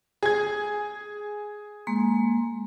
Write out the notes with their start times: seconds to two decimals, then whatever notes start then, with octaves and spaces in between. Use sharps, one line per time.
0.23 G#4 G#6
1.87 G#3 A#3 C6